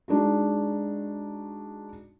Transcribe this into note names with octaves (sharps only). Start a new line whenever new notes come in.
G#3 D4 D#4 F#4